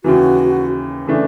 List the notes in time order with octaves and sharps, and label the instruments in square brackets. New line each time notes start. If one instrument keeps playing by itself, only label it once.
[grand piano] D#2 C#3 E3 [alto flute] F#4
[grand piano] C#3 E3 A3 D4